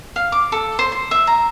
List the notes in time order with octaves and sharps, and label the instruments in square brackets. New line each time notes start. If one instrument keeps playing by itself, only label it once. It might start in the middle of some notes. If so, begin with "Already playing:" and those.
[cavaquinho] F5
D6
A4
C5
C6
E5
A#5